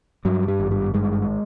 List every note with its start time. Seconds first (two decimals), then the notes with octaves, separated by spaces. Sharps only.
0.25 G2 F#3
0.48 G3
0.59 G#1
0.71 G3
0.94 G2 G#3